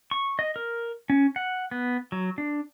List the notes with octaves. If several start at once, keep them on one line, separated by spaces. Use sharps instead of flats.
C#6
D#5
A#4
C#4
F#5
B3
F#3
D4